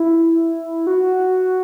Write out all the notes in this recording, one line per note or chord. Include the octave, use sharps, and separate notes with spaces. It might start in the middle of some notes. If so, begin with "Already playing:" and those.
Already playing: E4
F#4